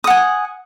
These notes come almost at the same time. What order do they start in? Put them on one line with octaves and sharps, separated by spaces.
D#6 F#5 G#5